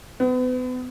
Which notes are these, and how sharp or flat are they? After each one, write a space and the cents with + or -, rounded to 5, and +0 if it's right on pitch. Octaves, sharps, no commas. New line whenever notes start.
B3 +35